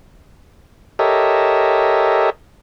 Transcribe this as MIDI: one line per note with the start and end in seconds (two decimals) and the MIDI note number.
0.99 2.30 67
0.99 2.30 69
0.99 2.30 70
0.99 2.30 73
0.99 2.30 75
0.99 2.30 76